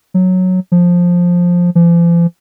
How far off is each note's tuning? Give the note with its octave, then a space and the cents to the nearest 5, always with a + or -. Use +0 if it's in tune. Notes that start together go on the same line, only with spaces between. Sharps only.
F#3 -5
F3 +10
F3 -45